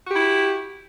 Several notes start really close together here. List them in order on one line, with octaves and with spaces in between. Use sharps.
F#4 G4 E4